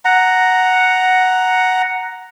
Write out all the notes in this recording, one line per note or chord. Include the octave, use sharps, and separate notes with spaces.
F#5 A#5